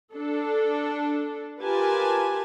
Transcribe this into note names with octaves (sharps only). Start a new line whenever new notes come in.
D4 A4
F4 G4 A#4 B4 G#5 A5